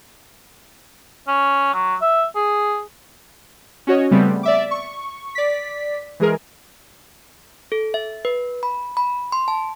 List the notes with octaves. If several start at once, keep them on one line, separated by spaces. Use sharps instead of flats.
C#4
F#3
E5
G#4
C#4 F#4 C#5 D#5
C#3 G3 A3 B3 C4
D5 E5 D6
C#6
D5 B6
E3 G#3 G#4 A#4
A4
E5
B4
B5
B5
C6
A5